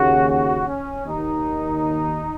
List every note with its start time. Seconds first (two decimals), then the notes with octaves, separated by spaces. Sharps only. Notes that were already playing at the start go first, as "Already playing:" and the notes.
Already playing: D#2 C#3 F#4
0.29 F#4
0.68 C#4
1.07 D#2 D#3 D#4